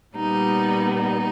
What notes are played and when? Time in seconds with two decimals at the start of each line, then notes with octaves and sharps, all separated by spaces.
0.14 A#2 G3 B3 D#4
0.93 D#4